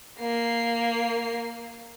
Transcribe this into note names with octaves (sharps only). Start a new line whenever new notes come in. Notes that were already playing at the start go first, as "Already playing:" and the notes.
A#3 C7